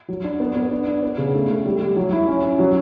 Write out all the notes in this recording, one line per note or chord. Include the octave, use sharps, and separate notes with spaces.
F#3
D4
B3
B3
D4
D4
B3
C#3
A3
A3
G3
G3
F#3
E4
C#4
C#4
F#3